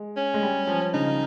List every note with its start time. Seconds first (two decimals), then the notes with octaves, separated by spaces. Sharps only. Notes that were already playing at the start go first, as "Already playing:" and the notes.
Already playing: G#3
0.17 C#4
0.34 G#3
0.43 G3
0.67 F3
0.93 C#3 D#4